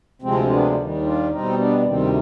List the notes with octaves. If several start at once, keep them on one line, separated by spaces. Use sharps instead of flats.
D2 C3 F3 G#3 C4
B3 D4
D#2 D#3 G3
D4 F4
B2 G3 C4 D#4
B3 D4
D2 C3 D#3 G3 C4